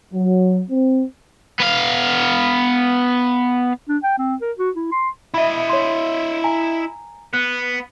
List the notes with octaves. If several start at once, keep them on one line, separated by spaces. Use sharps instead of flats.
F#3
C4
B3 F5
D4
G5
C4
A#4
F#4
E4
C6
E4 D#5 E5 B5
C#5 C6
G#5 A#5
B3 F#6